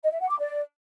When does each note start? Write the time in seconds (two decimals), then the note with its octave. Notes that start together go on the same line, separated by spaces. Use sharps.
0.03 D#5
0.12 E5
0.21 F#5
0.30 D6
0.39 D5